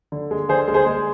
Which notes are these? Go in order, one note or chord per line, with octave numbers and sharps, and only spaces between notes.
D3
G#3
D3 G#4 C5
G#3
G#4 C5
G#3